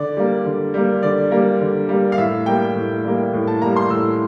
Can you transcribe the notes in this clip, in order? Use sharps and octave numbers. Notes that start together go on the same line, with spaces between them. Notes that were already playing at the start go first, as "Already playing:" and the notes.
Already playing: D3 D5
G3 A#3
D3
G3 A#3
D3 D5
G3 A#3
D3
G3 A#3
F5
A2 E5
G3 A#3 G5
A2
G3 A#3
A2
A5
G3 A#3 A#5
C6
A2 E6